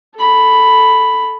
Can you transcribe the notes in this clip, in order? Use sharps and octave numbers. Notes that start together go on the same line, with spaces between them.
A4 B5